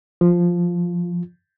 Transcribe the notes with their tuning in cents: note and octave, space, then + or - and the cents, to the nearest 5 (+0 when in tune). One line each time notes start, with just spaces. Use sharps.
F3 +0 F4 +0